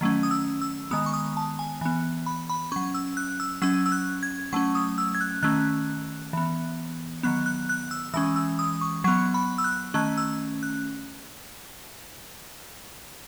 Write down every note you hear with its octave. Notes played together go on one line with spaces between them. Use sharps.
D#3 F#3 A3 C#4
D#6
E6
E6
D#3 G#3 B3 D#6
C#6
D#6
A5
G#5
E3 B3 G#5
B5
B5
F#3 C#4 C#6
E6
F#6
E6
F#3 C#4 E6
E6
F#6
G#6
F#3 A3 C#4 C#6
D#6
E6
G#6
F#6
D#3 A3 C#4 F#6
E3 B3
D#3 F#3 B3 F#6
F#6
F#6
E6
E3 G#3 C#4 E6
E6
D#6
C#6
F#3 B3 C#6
B5
E6
F#6
D#3 A3 C#4 F#6
E6
F#6